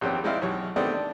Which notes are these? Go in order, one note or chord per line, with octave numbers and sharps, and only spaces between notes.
A#1 E2 D#3 C4 C#4 G4
G#3 C4 D#4 E4 D5 F5
B1 E3 G4 C#5
D#3 G#3 A3 B3 C4 D4
D4